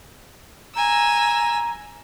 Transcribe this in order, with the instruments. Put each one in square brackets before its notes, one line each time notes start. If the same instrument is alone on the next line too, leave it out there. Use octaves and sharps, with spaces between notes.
[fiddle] G#5 E6 [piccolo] A#5